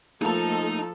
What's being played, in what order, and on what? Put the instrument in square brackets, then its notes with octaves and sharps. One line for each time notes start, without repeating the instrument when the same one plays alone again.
[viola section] F3 A4 [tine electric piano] A3 A#3 [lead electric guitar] D#4 A#5